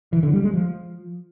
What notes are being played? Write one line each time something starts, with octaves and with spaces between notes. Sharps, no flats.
E3
D3
G3
G#3
F3